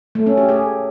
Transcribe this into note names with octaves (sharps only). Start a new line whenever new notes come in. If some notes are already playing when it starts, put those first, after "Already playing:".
A3
C#4
G4
G#4